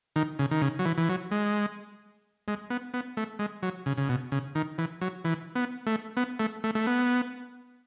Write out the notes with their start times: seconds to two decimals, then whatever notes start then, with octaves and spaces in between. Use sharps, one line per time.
0.16 D#3
0.39 C#3
0.51 D#3
0.62 C#3
0.79 F#3
0.86 E3
0.98 E3
1.09 F#3
1.31 G#3
2.48 G#3
2.70 B3
2.94 B3
3.17 A3
3.39 G#3
3.63 F#3
3.86 C#3
3.97 C#3
4.09 B2
4.32 C#3
4.55 D#3
4.78 E3
5.01 F#3
5.25 E3
5.55 B3
5.87 A3
6.17 B3
6.40 A3
6.64 A3
6.75 A3
6.87 B3